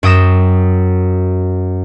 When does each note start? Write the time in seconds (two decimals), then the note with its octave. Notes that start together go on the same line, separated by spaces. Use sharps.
0.03 F#2 G5 D#6 A#6 E7